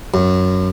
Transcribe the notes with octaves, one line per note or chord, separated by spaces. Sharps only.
F#2